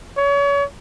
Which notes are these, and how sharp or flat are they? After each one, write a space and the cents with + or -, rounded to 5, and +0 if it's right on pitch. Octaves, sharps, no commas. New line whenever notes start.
C#5 +35